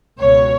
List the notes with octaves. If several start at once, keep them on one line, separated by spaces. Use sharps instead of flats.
C#2 B2 C#5